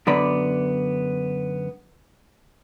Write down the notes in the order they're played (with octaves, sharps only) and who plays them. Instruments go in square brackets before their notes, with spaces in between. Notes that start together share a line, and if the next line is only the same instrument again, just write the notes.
[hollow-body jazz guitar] F#2 D3 B3 D5 B5